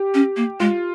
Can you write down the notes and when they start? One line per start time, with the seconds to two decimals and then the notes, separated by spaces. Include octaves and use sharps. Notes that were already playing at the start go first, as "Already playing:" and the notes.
Already playing: G4
0.14 C#4
0.37 A#3
0.60 G#3 F4